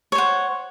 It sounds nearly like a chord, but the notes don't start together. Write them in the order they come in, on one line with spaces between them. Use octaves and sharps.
C#5 C5 F#5